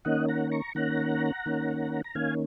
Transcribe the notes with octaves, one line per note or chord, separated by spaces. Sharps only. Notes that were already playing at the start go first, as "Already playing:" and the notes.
D#3 A#3 C#4 D#5 F#5
F#5 A#5
A#5 C#6
D#3 A#3 C#4 F#5 A#5
D#3 A#3 C#4
A#5
D#3 A#3 C#4 F5 G#5